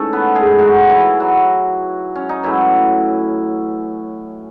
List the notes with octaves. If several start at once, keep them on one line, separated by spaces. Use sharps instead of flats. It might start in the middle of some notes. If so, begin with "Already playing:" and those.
Already playing: G#2 E3 A3 C#4 A4 C#5
B3 B4
G#3 G#4
F#3 F#4
E3 E4
F#3 F#4
C#4
D#4
A2 E3 F#3 E4